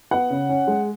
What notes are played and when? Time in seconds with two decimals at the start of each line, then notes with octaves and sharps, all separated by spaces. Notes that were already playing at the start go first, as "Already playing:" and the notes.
0.11 B3 F#5
0.30 C#3
0.49 C#4
0.67 G#3